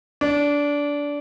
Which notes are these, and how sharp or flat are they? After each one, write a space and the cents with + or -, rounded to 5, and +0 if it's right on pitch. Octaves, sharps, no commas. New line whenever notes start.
D4 -20